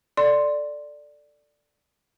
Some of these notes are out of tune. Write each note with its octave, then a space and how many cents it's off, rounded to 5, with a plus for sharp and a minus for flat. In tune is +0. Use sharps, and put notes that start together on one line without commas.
A4 +15 D5 +5 C6 +0